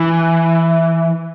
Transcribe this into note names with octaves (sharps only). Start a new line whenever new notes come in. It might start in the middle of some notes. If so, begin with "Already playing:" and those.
Already playing: E3